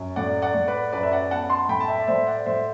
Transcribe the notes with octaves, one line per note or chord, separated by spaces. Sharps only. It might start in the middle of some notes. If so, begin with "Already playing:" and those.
Already playing: F#2
A2 D5 F#5
D5 F#5
A2
B4 D5
F#2 B4 D5
E5
D5 F#5
B3 F#5 A5
A5 C6
A2 G5 B5
A5
E5 G5
D5
A2 C5 E5
D5 F#5
A2 C5 E5